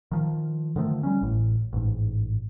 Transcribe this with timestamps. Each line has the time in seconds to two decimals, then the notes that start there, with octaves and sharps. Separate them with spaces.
0.12 D#3 F3
0.76 D3 D#3 F3 A3
1.03 G3 G#3 C#4
1.21 A1 A2
1.73 A1 G#2